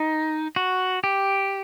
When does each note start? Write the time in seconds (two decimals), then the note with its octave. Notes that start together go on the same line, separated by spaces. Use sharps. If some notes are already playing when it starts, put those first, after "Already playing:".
Already playing: D#4
0.56 F#4
1.04 G4